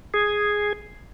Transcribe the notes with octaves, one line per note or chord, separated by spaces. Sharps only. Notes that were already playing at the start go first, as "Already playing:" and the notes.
G#4